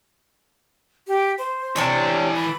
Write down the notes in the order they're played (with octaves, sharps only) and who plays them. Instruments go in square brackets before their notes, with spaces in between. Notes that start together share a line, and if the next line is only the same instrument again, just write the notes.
[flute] G4
C5
[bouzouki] C3 D4 C#5 [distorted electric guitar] E3 A5
[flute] B5